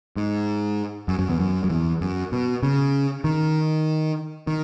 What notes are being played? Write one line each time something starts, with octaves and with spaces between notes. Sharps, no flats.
G#2
F#2
F#2
E2
F#2
F#2
E2
F#2
B2
C#3
D#3
D#3